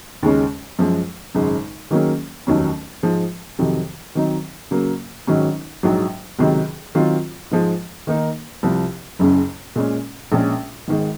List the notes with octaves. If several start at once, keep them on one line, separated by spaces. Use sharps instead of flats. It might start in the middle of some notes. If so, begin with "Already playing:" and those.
D#2 C#3 G#3 C#4
F#2 F3 G#3
G#1 F#2 C#3 G#3
D#3 F#3 A#3 C#4 G#4
F1 D#2 D#3 F#3 C#4
G#2 F3 G#3
F2 C3 D#3 F#3
D#3 F#3 C4 D#4
C#3 F#3 A#3
G#1 G#2 D#3 F#3 C#4
A#1 G#2 F#3
C#2 C3 D#3 F#3
D#3 F#3 C4 F4
G#2 F3 G#3
D#3 A#3 D#4 A#4
C2 C3 F3
F#1 F#2 C#3
A#2 G#3 C#4
A#1 A#2 G#3 C#4 G#4
G#1 G#2 D#3 G#3